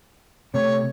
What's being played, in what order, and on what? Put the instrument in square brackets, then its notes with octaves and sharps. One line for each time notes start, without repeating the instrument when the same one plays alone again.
[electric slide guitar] C3 A3 [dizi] C#5